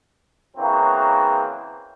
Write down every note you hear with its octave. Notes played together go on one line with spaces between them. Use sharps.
C#3 E3 F#3 A#3 C4